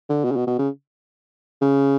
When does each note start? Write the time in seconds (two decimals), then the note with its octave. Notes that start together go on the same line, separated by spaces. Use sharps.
0.09 D3
0.24 B2
0.31 C#3
0.36 B2
0.47 B2
0.59 C#3
1.61 C#3